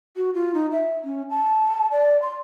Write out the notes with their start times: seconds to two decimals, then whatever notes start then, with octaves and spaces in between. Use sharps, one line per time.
0.16 F#4
0.34 F4
0.54 D#4
0.72 E5
1.04 C#4
1.30 A5
1.92 D5
2.22 C6